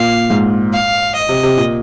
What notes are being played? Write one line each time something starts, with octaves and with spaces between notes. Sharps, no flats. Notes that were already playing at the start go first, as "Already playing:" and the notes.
Already playing: A#2 F5
G#2
F5
D#5
C3
C3
A#2